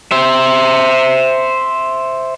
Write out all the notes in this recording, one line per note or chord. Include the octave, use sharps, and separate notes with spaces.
C5 E5